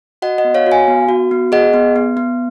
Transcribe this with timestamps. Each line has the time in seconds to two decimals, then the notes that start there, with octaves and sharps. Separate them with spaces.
0.22 F#4 D#5 F#5
0.38 D#5 F#5
0.44 B3
0.55 C#5 F5
0.66 F#4
0.71 F5 G#5
0.88 B3
1.09 F#4
1.31 B3
1.52 G#4 D#5 F#5
1.74 B3
1.96 B3
2.17 B3